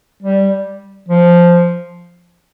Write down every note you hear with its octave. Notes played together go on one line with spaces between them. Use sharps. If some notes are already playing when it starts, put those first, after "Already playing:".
G3
F3